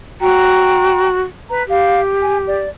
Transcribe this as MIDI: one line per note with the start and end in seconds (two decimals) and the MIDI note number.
0.21 1.21 66
0.21 1.07 79
0.21 1.07 82
1.49 1.62 71
1.49 1.62 82
1.68 2.57 67
1.68 2.00 77
2.20 2.37 80
2.47 2.70 74